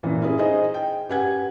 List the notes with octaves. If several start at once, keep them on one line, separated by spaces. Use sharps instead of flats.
F#2 A#2 E3
C#4 E4 G#4
D#4 G#4 C5 D#5
G5
F#2 G4 B4 F#5 G#5 G#6